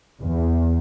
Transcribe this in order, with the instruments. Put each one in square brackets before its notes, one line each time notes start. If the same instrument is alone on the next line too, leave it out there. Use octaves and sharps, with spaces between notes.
[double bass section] E2